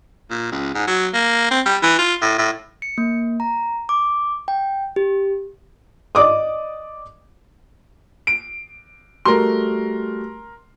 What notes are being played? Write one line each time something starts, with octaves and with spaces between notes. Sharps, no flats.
A#2
C#2
G#2
F#3
A#3
C4
G3
E3
F4
A2
A2
C#7
A#3
A#5
D6
G5
G4
D5 D#5 D6 D#6
D7
G3 A3 F#4 A#4 C6